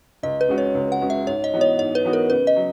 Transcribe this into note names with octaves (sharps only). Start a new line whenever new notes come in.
C#2 D#5
B4
C#3 G#3 C#4 F#4
C#5
C#2
F#5
C#3 G#3 C#4 F#4
E5
G#2 C#5
D#5
E3 B3 D#4 F#4
C#5
G#2 C#5
B4
E3 B3 D#4 F#4
A#4
C#3 B4
D#5
F#3